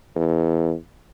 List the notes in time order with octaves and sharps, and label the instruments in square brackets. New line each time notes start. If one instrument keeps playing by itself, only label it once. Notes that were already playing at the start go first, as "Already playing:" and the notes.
[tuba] E2